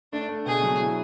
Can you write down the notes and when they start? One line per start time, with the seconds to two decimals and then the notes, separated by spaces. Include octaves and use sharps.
0.13 A3 D4
0.29 A3
0.46 B2 G#4
0.63 F#3
0.80 E4